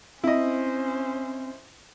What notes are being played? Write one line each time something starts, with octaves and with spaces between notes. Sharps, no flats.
C4 C#4 E4 C5 D#5